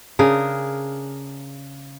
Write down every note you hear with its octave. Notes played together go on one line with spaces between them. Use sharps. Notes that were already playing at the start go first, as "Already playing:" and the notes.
C#3 D4 G#4 A#4